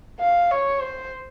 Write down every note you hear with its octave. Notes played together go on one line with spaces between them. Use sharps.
F5
C#5
C5